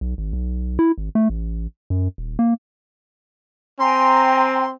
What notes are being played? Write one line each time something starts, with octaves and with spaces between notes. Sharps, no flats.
B1
G#1
B1
E4
G#1
A3
A1
F#2
D#1
A#3
C4 G5 G#5 A#5 C6